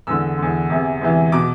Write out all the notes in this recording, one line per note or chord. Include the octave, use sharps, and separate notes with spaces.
E2 D3 E6
E2 D3
E2 C3 E3
E2 C3 E3
B2 D6